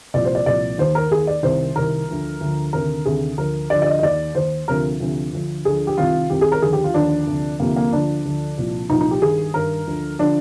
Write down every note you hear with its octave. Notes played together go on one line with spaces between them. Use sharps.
C2 A#2 F3 D5
C5
D5
C2 A#2 F3 D5
D#2 D#3 C5
A#4
D#2 D#3 G#4
D5
C2 C3 D#3 C5
C2 C3 D#3 A#4
D2 D3 F3
D2 D3 F3
D2 C3 D#3 A#4
D2 C3 D#3 G#4
D2 D3 F3 A#4
D2 D3 F3 D5
D5
D#5
D#5
D#2 D#3 D5
D#2 D#3 C5
D2 C3 F3 A#4
D2 C3 F3
D2 D3 F3
D2 D3 F3 G#4
G4
C2 C3 D#3 F4
C2 C3 D#3 G4
G#4
A#4
D#2 D3 F3 G#4
G4
F4
D#2 D3 F3 D4
D2 C3 F3
D2 C3 F3 A#3
A#3
D2 D3 F3 D4
D2 D3 F3
C2 A#2 F3
C2 A#2 F3 D#4
D#4
G4
G2 D#3 G#4
G2 D#3 A#4
D2 D3 F3
D3 F3 D4